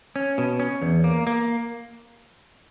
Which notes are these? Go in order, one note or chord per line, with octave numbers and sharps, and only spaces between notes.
C#4
B2
C#4
E2
A#3
A#3